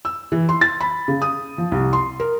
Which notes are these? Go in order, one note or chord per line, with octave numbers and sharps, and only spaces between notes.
E6
E3
C6
A6
B5
C#3
D#6
F3
C2
C6
A#4